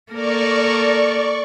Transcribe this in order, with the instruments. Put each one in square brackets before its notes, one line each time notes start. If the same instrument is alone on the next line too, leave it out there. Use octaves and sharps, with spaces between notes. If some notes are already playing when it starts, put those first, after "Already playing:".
[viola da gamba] A#3 A4 A#4 [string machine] D5 C#6